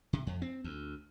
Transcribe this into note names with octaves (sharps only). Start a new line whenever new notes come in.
C3
F2
C4
D2